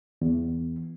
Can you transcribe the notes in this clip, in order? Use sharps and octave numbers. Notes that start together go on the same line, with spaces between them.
E2